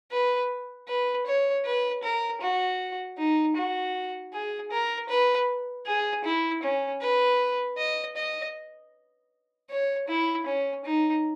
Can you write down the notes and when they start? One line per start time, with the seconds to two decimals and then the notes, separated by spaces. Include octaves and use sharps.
0.11 B4
0.88 B4
1.26 C#5
1.65 B4
2.03 A#4
2.41 F#4
3.18 D#4
3.56 F#4
4.33 G#4
4.71 A#4
5.09 B4
5.86 G#4
6.25 E4
6.63 C#4
7.01 B4
7.78 D#5
8.16 D#5
9.70 C#5
10.08 E4
10.46 C#4
10.85 D#4